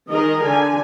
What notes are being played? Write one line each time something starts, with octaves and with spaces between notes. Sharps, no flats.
D#3 G#4 A#4 D#5
D3 G#5